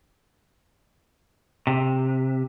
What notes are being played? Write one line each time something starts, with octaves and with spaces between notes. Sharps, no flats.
C3